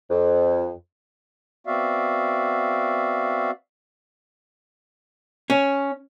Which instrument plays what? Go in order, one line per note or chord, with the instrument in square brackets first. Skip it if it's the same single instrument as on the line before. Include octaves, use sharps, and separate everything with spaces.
[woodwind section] F2
[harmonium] B3 C4 F#4 D5 E5 F5
[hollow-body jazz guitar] C#4